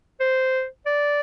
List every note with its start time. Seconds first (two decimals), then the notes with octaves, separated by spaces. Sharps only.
0.20 C5
0.86 D5